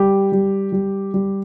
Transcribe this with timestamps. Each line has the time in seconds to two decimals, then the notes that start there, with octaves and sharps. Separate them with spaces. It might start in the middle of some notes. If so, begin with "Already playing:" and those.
Already playing: G3 G4
0.32 G3
0.72 G3
1.14 G3